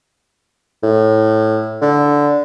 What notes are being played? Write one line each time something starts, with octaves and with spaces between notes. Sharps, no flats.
A2
D3